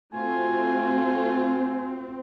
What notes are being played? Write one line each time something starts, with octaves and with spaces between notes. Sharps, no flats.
A3 C4 F4 F#4 G#5